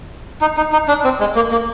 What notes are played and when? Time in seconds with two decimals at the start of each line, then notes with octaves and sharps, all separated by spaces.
0.41 D#4
0.57 D#4
0.73 D#4
0.88 D4
1.04 C4
1.20 G#3
1.36 A#3
1.52 A#3